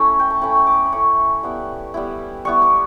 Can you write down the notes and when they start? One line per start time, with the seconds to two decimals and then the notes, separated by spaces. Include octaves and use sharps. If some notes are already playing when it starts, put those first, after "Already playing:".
Already playing: A3 C#4 E4
0.19 G5
0.30 A5
0.42 A3 C#4 E4 B5
0.67 D6
0.86 B5
0.92 A3 C#4 E4 C#6
1.43 G3 B3 E4
1.94 G3 B3 E4
2.45 G3 B3 E4 C#6
2.62 D6